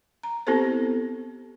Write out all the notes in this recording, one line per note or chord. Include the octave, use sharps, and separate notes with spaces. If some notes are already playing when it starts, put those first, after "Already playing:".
A#5
B3 C4 E4 G4 A4 C5